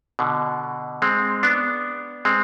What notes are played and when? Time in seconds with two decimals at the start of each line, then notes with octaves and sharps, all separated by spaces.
0.19 B2 D3
1.02 G#3 C4
1.43 B3 D4
2.25 G#3 C4